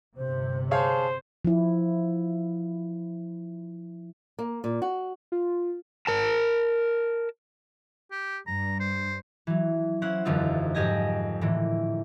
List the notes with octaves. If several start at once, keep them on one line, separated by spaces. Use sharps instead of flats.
G1 C3 C5
G#4 C5 C#5 F5 A5
F3 E4
A#3
A#2
F#4
F4
A#4 A5
G4
G2 A#5
C5
E3 F#3
C#4 E4 C5 F#5
E1 F#2 D3 D#4 F4 E6
F2 G#2 G4 D#5 G#5 A#6
A2 D3 E3 A#3